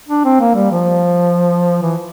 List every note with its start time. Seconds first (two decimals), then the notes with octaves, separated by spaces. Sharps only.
0.08 D4
0.24 C4
0.40 A#3
0.55 G3
0.71 F3
1.82 E3